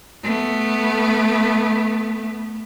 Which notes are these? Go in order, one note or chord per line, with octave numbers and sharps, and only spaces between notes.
A3 B3